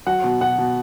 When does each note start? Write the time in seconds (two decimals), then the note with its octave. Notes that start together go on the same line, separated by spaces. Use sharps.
0.07 F#3 F#5
0.24 B2
0.41 B2 F#5
0.58 B2